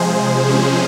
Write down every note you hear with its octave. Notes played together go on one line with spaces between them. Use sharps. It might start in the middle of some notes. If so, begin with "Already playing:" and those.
Already playing: C3 F3 G#3 G#4 C5
C#4